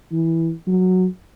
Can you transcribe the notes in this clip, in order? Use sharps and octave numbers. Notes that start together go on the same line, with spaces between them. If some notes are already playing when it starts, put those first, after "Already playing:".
E3
F#3